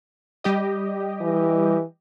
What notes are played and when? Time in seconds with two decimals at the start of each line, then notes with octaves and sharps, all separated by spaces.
0.44 G3 G4 D#5
1.21 E3